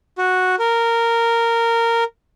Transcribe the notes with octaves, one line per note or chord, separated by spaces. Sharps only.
F#4
A#4